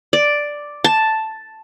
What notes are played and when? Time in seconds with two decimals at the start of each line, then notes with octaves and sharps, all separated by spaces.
0.13 D5
0.84 A5